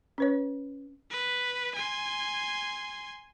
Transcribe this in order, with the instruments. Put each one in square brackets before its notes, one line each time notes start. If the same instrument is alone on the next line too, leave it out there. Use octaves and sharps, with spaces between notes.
[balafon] C#4 B4 C#5
[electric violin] B4
G#5 C6